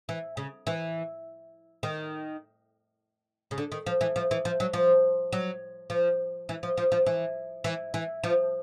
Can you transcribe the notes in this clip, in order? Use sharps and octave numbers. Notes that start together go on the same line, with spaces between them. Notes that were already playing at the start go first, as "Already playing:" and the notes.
E3
C#3
E3
D#3
C#3
D3
D#3
F3
E3
F3
E3
F3
F#3
F3
F#3
F3
E3
F3
F3
F3
E3
E3
E3
F3